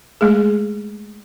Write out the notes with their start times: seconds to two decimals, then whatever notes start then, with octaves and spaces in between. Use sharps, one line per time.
0.21 G#3 A3 G#4